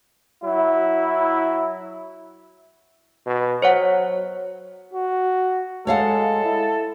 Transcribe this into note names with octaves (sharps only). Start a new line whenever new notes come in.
F#3 E4
B2
F#3 C5 C#5 F#5
F#4
G#3 A4 C#5 F5 F#5
E4